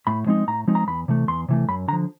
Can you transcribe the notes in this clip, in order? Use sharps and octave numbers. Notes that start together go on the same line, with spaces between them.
A2 B5
F3 G#3 C4 D#4
A2 A#5
F3 G#3 C4 D#4
A#5
E2 B5
C3 E3 A3
E2 C6
C3 E3 A3
F#2 B5
D3 F3 A#5